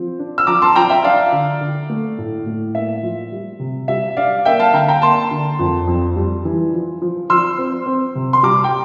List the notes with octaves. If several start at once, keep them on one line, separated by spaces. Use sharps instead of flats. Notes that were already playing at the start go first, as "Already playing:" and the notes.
Already playing: F3 C4
D4
E6
F3 A#5 D6
A5 C6
F3 G5 A#5
E5 G5
D4 D5 F5
D3
D3
A3
A2
A2
A#3 E5
F3
G3
C3
G3 E5
D4 D5 F5
A#3 E5 G5
F5 A5
D3 G5 A#5
G5 A#5
A#3 A5 C6
D3
F2
F2
G3
E3
F3
F3
F3 C6 E6
C4
C4
C3
C6
G3 A#5 D6
G5